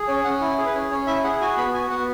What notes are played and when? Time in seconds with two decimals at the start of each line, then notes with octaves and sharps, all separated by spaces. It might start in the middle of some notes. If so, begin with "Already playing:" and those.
Already playing: G#4
0.08 C#4 C#5
0.24 C#4 F#5
0.41 E4
0.58 G#4
0.66 B4
0.74 C#4
0.91 C#4 C#5
1.07 E4 E5
1.24 G#4 F#5
1.41 F#4 G#5
1.57 B3 B5
1.74 F#4 G#5
1.90 B3 F#5